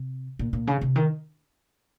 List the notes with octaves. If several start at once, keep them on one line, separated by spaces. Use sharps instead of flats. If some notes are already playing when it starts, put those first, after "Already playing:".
Already playing: C3
A#2
A#2
C#3
C3
D#3